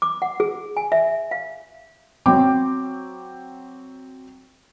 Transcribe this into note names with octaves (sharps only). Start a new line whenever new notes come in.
D6
F#5
G#4
G#5
E5
F5
F#3 C4 G5 D6